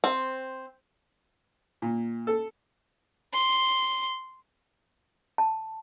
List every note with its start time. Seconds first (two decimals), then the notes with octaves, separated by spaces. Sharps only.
0.04 C4
1.82 A#2
2.27 A4
3.34 C6
5.38 A5